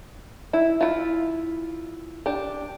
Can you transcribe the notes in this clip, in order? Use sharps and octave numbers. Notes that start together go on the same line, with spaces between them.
E4
E4 F4
D4 G4